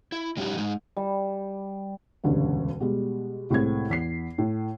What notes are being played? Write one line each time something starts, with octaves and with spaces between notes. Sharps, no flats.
E4
F#3 G3 C#4 D#4 F#4 G4
G#3 D#4
G3
E1 D2 G2 C#3
B2 G3 G#3
C2 A2 C3 G#3 C4 G#6
E2 B6 C7
A2